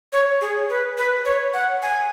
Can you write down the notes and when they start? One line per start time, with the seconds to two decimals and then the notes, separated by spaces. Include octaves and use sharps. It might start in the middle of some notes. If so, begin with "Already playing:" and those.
0.13 C#5
0.41 G#4
0.69 B4
0.98 B4
1.25 C#5
1.54 F#5
1.82 G#5